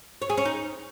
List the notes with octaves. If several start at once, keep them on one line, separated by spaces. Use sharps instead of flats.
C#5
G#4
C#4
D#4